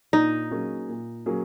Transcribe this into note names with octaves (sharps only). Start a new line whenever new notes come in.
A#2 D#4
F#3 A#3 C#4 G#4
A#2
F#3 A#3 C#4 G#4